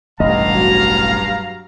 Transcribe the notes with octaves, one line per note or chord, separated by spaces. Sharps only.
E1 A1 G2 A3 D#5 F5 A#5
F#3